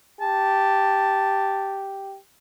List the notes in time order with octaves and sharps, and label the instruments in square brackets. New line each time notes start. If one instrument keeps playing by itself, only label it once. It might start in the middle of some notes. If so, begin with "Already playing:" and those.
[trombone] G4 [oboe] A5